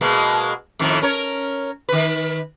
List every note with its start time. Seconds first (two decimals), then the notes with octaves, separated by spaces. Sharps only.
0.01 B2 G#3 A#3
0.79 F2 A2 D#3
1.02 C#4 A#4 C#5
1.89 D#3 B4